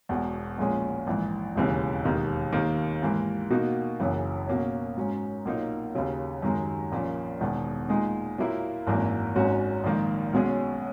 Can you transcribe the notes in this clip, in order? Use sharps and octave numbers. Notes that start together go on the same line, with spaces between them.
E1 E2 B2
A#1 A#2 G#3 C#4 G#4
A#1 G#2 E3
E1 D#2 C#3 E3
E1 D#2 D#3
D#2 D#3 A#3
G#2 E3 A#3
B2 A#3 D#4 F#4
F#1 F#2 C#3 E3
B2 A#3 C#4
G#2 F#3 C#4
B1 A#2 A#3 D#4
D#2 C#3 F#3
F#2 D#3 G#3
A#1 A#2 A#3 C#4
E1 E2 D#3
A#2 G#3 D#4 G#4
A#2 F#3 A#3 E4
G#1 F#2 E3 A#3
G#1 G#2 F#3 C#4 F#4
A#1 G#2 D#3 A#3
B1 B2 G#3 C#4 G#4